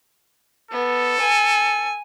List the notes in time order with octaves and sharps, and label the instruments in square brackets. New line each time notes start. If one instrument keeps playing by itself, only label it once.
[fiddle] B3 [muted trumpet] A4
[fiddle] G#5